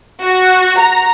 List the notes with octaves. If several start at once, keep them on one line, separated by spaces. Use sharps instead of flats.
F#4
A#5